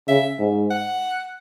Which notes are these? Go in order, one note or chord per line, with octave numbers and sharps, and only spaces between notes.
C#3 E5
G#2
F#5